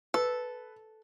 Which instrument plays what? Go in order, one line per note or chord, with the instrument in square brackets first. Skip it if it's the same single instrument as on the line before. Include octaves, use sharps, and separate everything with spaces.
[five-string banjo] A4 [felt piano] B4